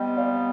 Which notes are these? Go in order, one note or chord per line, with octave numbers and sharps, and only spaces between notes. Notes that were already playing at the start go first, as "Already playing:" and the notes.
Already playing: C3 G3 B3 D#5 G5
D5 F5